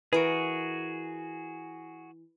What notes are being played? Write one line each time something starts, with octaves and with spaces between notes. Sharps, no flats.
E3 F#4 G#4 A#4 B4 D7